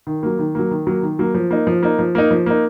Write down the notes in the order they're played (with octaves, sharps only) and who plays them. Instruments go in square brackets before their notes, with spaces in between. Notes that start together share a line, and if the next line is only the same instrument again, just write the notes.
[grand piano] D#3
F#3 A#3
D#3
F#3 A#3
D#3
F#3 A#3
D#3
F#3 A#3
F3
A#3 D#4
F3
A#3 D#4
F3
A#3 D#4
F3
A#3 D#4